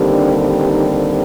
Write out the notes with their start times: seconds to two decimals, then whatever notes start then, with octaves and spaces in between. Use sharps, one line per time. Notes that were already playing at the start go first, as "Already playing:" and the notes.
Already playing: D#2 D3 G3 C4
0.12 D4
0.65 D#4